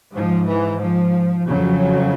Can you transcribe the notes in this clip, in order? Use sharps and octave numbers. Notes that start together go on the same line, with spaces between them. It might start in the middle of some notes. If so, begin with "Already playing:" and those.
G#2 F3
E3
F3
F2 C#3 F#3